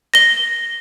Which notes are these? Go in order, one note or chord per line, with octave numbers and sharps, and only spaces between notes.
A#6 G7